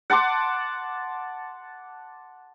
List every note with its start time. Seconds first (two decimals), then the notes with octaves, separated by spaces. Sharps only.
0.10 F#5 A5 C6 D6